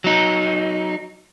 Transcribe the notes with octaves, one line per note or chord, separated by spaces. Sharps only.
F#3 D#4